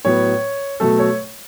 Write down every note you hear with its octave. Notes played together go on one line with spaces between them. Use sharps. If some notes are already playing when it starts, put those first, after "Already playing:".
A2 F#3 B3 C#5
B2 F#3 A3 A4
C#5